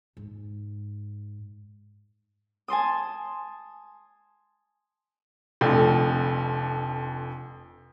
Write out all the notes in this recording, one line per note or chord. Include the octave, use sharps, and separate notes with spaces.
G#2
G#5 A5 C6 D#6
F1 F2 D3